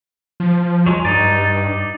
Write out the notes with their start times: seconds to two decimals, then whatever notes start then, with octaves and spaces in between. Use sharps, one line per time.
0.40 F3
0.86 F#3 G#3
1.05 G2 D#4 D5